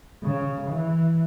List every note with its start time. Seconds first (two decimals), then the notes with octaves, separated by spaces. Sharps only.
0.23 C#3
0.69 E3